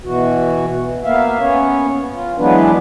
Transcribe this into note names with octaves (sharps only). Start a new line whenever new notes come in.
B2 E3 F#4
A#3 B3 E5 F5
B3 C#4 C#5
F4
E3 F#3 G#3 B3 D4 B4